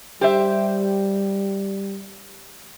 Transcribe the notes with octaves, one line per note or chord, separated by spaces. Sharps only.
G3 G4 C5 E5